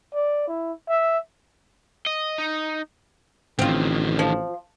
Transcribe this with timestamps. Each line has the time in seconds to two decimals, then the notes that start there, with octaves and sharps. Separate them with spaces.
0.14 D5
0.48 E4
0.89 E5
2.06 D#5
2.38 D#4
3.59 A1 D3 D#3 C4 F4
4.19 F3